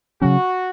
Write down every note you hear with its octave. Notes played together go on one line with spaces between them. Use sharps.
C#3 F#3 C#4 F#4